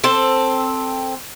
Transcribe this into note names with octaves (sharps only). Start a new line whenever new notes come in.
C4 A4